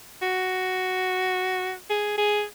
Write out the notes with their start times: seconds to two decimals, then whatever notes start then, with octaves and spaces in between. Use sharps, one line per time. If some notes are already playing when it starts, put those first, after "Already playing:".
0.22 F#4
1.90 G#4
2.17 G#4